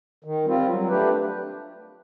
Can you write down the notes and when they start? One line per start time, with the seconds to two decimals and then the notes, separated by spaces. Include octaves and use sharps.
0.24 D#3
0.45 G3 C4 F4
0.67 F#3
0.88 A3 D4 G4 B4